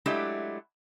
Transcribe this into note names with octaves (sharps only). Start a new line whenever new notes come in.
F#3 G#3 A3 D4 E4 G4